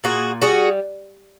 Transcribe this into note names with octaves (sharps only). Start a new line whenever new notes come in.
A#2 F#4 G#4
G3 F#4 G#4